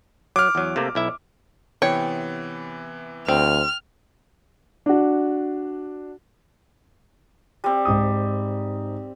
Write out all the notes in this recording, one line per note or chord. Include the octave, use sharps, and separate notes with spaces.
F#3 D6 F6
E2 F#3
C3 A3 A#3
B1 E4 E5
C3 E3 B3 C#5 G5
D2 C4 F6
D4 F#4
G3 C4
G#2 D#6